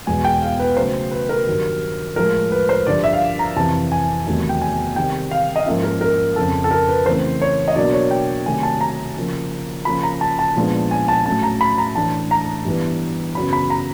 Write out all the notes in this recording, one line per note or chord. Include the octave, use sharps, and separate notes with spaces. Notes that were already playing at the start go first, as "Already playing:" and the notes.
E2 B2 G#3 B3 G#5
G5
F5
B4
C#3 F#3 A3 C5
B4
A#4
G2 D#3 F#3
A2 F3 G#3 A#4
B4
C5
G2 D3 F3 D5
E5
F5
A#5
F2 C3 E3 A5
G#5
E2 C3 D#3 F#3 A3
G5
G#5
C3 D#3 G3 C4 G5
F5
D#5
G#2 F3 A#3 C#4 E5
A#4
A#4
F2 C#3 F3 A4
A4
A#4
B4
C#3 E3 A3 C4 C5
C#5
D#5
B2 F#3 A#3 D4 D5
C#5
G5
C3 D#3 F#3 A3 G#5
A5
A#5
C#3 F3 A#3
C#3 F3 A#3 C#4 B5
A#5
A5
A5
A#2 F3 G#3 B3 D4
G#5
A5
A2 F#3 A3 C#4 A5
A#5
B5
A#5
A2 E3 A3 D4 A5
A#5
G2 E3 G3 B3 D4
F#2 C#3 F#3 B3 B5
B5
A#5